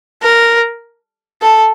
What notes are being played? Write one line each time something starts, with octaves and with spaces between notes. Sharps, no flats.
A#4
A4